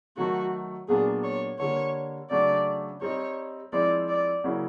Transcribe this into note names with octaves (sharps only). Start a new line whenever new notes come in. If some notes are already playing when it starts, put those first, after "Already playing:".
D#3 F#3 A3 F#4
A#2 F#3 B3 D4 F4 G#4
C#5
D3 G3 A#3 C#5
C#3 F#3 A3 D4 D5
G3 C4 D#4 C#5
F3 G#3 C4 E4 D5
D5
C#3 F#3 A#3 C#4 E4